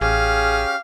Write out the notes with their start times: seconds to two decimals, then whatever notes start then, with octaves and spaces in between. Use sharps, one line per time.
0.01 A1 C#4 G4 G#4 F5